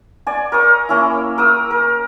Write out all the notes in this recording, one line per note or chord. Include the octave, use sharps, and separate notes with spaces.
D5 G#5
A#4 C#5 D#6
A#3 C#4 E4
A#4 D#6 E6
A#4